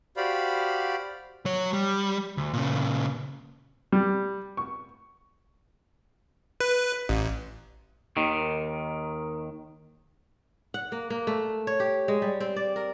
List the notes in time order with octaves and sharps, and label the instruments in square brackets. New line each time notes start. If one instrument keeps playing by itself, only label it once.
[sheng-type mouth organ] F#4 G4 C5 D5 F5 B5
[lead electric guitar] F#3 C#5
G3
D2
A#2 C#3
[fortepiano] G3
C#6
[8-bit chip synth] B4
A1
[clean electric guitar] D#2 D#3
[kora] F#5
A#3
A#3
A3
C#5
G4
G#3
G3
C4
D5
A#4